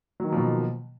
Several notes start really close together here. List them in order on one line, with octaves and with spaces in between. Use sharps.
F#3 D#3 A#3 F3 B2